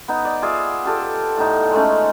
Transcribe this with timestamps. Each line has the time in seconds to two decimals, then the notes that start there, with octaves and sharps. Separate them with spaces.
0.08 B3 D#4
0.25 D5
0.42 F4 G#4 D5 E5
0.85 F4 G4 A4 D5
1.37 A2 D#4
1.71 G#3 A3 C#4